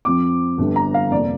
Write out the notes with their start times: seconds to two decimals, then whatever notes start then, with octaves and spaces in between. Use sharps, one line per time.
0.05 F2 F3 C4 D6
0.58 G1 G2 D3 G3
0.76 A#5
0.94 F5
1.11 F2 C3 A#3 D5